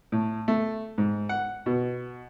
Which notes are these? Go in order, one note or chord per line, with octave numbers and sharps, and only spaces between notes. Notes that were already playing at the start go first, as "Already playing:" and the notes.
A2
A3
G#2
F#5
B2